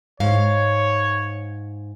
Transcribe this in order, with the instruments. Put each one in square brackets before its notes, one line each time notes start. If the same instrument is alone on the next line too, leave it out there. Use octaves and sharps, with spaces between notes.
[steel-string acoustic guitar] G#2 F5 [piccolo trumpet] C#5